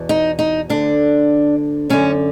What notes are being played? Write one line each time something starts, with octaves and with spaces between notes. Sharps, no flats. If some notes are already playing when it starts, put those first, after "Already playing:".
Already playing: E2 B2
D#4
D#4
D2 D3 D4
F#2 D3 C#4